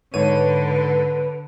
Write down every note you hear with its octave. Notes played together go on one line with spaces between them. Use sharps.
G#2 D3 B4 C#5 D#7